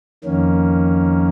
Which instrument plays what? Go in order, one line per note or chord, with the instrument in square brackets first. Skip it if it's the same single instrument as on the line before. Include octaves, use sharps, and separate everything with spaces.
[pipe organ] F2 D#3 A#3 C#4